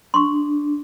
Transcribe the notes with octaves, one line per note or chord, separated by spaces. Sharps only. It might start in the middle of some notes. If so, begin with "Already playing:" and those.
D4 C6 C#6